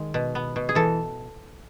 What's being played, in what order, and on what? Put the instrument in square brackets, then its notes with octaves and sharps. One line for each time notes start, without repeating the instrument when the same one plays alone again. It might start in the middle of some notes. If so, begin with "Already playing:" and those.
Already playing: [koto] D#3 G#3
B2
B3
B2
G#4
E3 A4